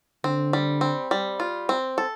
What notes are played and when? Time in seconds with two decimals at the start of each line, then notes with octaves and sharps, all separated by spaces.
0.24 D3 C4
0.53 G3
0.81 C4
1.11 G3
1.40 F4
1.69 C4
1.98 A4